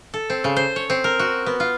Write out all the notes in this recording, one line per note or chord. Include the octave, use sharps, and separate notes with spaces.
A4
C4
C#3
C5
C#5
C4
A#4
F#4
B3
F4